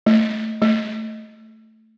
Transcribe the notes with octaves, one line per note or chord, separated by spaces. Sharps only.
A3
A3